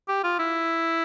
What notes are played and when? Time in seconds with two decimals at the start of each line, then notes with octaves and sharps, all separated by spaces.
0.08 G4
0.24 F4
0.39 E4